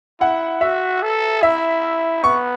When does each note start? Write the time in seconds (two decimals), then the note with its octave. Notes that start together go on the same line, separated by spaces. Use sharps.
0.20 E4 F#5
0.61 F#4 E5
1.03 A4
1.42 E4 E5
2.24 B3 C#6